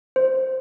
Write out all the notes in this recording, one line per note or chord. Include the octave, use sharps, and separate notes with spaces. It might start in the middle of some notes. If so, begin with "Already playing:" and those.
C5